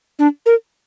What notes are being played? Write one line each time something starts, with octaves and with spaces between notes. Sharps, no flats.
D4
A#4